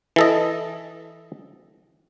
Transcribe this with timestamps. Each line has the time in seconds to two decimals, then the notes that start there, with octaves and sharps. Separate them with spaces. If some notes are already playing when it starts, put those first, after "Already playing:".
0.16 E3 A4 D#5